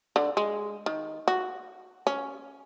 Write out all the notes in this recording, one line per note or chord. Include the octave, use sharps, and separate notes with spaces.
D3
G#3
D#3
F#4
C#4